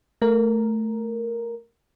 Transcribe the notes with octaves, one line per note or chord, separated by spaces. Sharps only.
A3 A#4